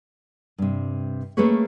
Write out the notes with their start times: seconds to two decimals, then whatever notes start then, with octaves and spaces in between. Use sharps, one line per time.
0.58 G2 C3
1.37 A3 A#3 C#4 G#4 B4 C#5